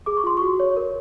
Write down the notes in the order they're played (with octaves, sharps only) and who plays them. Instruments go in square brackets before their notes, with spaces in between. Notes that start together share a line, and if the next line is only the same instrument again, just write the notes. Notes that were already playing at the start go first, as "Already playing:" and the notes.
[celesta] G#4 D6
C#6
F4 C6
F#4 C#6
C#5
A#4